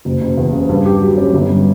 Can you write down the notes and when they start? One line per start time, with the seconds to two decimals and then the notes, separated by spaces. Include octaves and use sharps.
0.05 F#1
0.21 F#1
0.37 E2
0.53 C#3
0.69 G2
0.86 G4
1.01 F#3
1.17 C#4
1.33 G1
1.49 G3